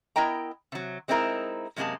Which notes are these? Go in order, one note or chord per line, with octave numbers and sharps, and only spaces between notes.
B3 E4 A#4 D#5 G5 A#5
C3 F#3
G#3 C4 D#4 E4 A#4
F#2 C3 G#3 A#3 G#4 A5